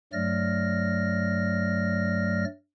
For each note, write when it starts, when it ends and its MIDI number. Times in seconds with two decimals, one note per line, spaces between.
0.13 2.45 43
0.13 2.45 54
0.13 2.45 57
0.13 2.45 74
0.13 2.45 89
0.13 2.45 94